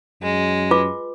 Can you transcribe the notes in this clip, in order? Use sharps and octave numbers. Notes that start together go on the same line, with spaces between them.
F#2 G#3
F4 B4 D6